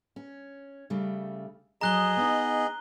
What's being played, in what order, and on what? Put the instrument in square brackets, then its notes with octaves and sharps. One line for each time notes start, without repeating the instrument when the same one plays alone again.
[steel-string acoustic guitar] C#4
C#3 G3 A3
[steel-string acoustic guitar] F2 F#3 [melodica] G#4 D#5 [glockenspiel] A#5 F#6 G7
[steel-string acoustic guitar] B3 D#4